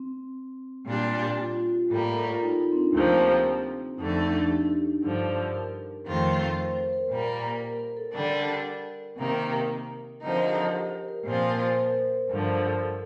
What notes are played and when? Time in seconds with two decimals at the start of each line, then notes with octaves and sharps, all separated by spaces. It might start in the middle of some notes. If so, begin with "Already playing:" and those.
Already playing: C4
0.87 A#2 G3 D4 F4
1.38 F4
1.56 F4
1.73 G4
1.90 A2 G3 A#3 A4
2.03 A#4
2.16 A4
2.29 F4
2.42 D#4
2.59 D#4
2.72 C4
2.77 D4
2.94 D2 C3 F3 A#3 C4
3.99 F2 D3 A3 D#4
4.24 D4
4.50 G4
5.02 G2 D3 F3
5.54 A#4
6.06 F2 D#3 A3 C4 F4
6.58 C5
6.75 C5
6.93 A#4
7.10 A#2 G3 A#3
7.62 A#4
7.79 A#4
7.97 A4
8.13 D3 G3 D4 A#4
9.18 C3 D#3 A#3
10.22 D3 F3 C4 D#4 A#4
10.48 G4
10.73 G4
11.08 A#4
11.25 A#2 F3 C4 F4 C5
11.43 A#4
11.60 C5
11.78 A#4
12.30 G2 D3 F3
12.82 A4